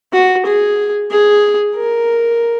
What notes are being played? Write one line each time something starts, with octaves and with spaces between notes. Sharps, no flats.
F#4
G#4
G#4
A#4